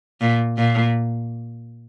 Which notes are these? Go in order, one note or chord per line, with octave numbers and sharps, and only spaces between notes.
A#2
A#2